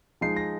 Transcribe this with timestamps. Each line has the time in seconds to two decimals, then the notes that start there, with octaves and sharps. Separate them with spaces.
0.21 F3 G#3 D#4 C7
0.37 A#6